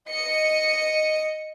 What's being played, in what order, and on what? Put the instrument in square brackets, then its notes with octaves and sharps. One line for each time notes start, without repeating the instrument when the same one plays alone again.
[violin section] D#5 C#7